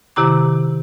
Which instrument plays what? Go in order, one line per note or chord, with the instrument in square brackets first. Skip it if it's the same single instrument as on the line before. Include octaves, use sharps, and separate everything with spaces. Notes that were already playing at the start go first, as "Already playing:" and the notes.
[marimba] C3 D#3 E4 G4 A#5 D6